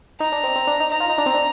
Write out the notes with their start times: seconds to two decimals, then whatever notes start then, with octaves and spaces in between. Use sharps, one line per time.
0.20 D#4 A#5
0.32 D4
0.44 C4
0.56 C4
0.67 D4
0.80 D#4
0.91 D#4 A#5
1.00 F4
1.09 D#4
1.18 D4
1.26 C4
1.34 D4